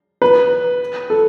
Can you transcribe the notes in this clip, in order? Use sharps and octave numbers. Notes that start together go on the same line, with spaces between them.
B4
A4